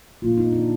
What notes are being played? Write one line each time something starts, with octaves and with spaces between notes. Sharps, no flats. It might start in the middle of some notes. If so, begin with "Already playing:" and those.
A#2 F3 A#3 F4
D#4
D4